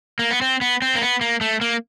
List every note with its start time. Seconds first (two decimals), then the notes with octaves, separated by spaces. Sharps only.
0.19 A#3
0.31 B3
0.41 C4
0.61 B3
0.82 C4
0.95 A#3
1.01 B3
1.21 A#3
1.41 A3
1.61 A#3